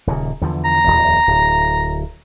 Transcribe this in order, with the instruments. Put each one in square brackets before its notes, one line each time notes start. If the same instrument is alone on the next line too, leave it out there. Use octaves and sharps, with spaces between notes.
[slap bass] D#1 A#2 C#3
E2 D3 F3
[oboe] A#5
[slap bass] D1 G1 E2
D1